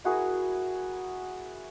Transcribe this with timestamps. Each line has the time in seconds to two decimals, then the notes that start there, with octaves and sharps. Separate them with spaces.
0.04 E4 F#4 G#4 A#4